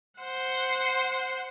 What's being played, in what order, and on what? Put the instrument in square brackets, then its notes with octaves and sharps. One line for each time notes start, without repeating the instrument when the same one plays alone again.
[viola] C5 F#5